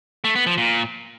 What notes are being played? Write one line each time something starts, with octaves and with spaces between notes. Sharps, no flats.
A3
B3
F3
A#2